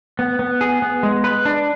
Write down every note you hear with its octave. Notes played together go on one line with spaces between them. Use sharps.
B3
B3
G#4
B3
G#3
B4
D4